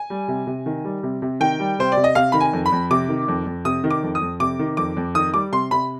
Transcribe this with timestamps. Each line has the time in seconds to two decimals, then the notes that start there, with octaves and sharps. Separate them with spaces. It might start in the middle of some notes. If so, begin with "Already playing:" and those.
Already playing: G#5
0.10 G3
0.28 C3
0.47 C3
0.66 D#3
0.85 G3
1.03 C3
1.22 C3
1.40 D#3 G5
1.60 G3
1.79 C3 C5
1.92 C3 D5
2.04 D#5
2.15 C3 F5
2.32 D#3 B5
2.41 G#5
2.53 F2
2.66 B5
2.72 F2
2.90 C3 D6
3.09 D#3
3.28 F2
3.46 F2
3.65 C3 D#6
3.84 D#3
3.90 D6
4.03 F2
4.15 D#6
4.22 F2
4.40 C3 D6
4.59 D#3
4.77 F2 D6
4.97 F2
5.15 D#3 D#6
5.34 G3 D6
5.52 C3 C6
5.71 C3 B5